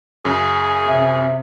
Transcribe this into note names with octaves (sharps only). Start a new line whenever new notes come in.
F#2 C#3 G#4
C3 E5